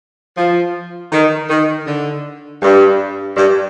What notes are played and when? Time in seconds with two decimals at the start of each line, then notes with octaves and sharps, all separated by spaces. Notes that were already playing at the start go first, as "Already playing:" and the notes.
0.37 F3
1.12 D#3
1.50 D#3
1.87 D3
2.62 G2
3.37 G2